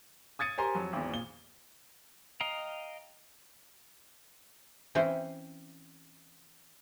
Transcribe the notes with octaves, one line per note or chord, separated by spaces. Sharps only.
D#6 G#6 A6 C#7 D#7
G4 A#4 C5 G#5 A#5 C6
F2 F#3
G#1 E2
A#2 G7
D#5 F5 G5 A#5
E3 C4 C#4 E4 C5